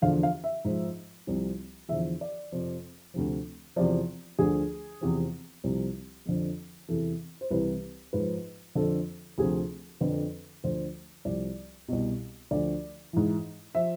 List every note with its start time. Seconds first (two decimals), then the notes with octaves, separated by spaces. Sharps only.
0.02 E2 D3 F3 F5
0.23 F5
0.44 E5
0.65 G#2 F3
1.27 C2 C3 F3
1.89 E2 D3 F3 E5
2.21 D5
2.52 F2 C3 F3
3.14 D2 C3 F3
3.76 E2 C3 F3 D5
4.38 D2 D3 F3 G#4
5.01 E2 C3 F3
5.64 C2 C3 F3
6.26 F2 D3 F3
6.89 E2 C3 E3 A4
7.41 C5
7.51 C2 C3 E3 B4
8.13 G#2 F3 B4
8.75 F2 D3 F3 A4
9.38 D2 C3 F3 G#4
10.01 F2 D3 F3 B4
10.64 D2 D3 F3 C5
11.25 C2 C3 F3 D5
11.88 C2 B2
12.51 D2 D3 F3 D5
13.13 G#2 E3
13.75 F3 E5